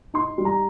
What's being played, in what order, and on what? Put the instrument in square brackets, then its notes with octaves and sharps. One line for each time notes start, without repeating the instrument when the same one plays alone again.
[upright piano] D#4 C6
G3
A#5